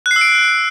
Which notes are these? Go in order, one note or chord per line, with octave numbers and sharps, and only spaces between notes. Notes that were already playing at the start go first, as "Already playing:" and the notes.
F#6
C7
E6
D7